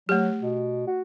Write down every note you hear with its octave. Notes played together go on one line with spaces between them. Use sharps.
F#3 A3 G4
B2
F#4